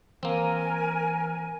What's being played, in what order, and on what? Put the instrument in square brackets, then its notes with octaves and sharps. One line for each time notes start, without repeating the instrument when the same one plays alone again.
[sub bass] E3 [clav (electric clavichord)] A#3 C4 [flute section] A#4 G#5